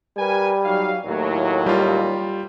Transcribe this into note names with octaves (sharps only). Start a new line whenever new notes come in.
G3 A#4 B4 G#5
F#3 D#4 F5
D#2 A2 F#3
G3 F4